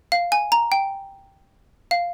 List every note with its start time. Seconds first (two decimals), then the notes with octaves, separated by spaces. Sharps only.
0.12 F5
0.32 G#5
0.52 A#5
0.72 G5
1.91 F5